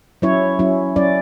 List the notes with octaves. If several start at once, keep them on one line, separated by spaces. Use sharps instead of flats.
F#3 C#4 E4 C#5
F#3 C#4 E4
F#3 C#4 E4 D5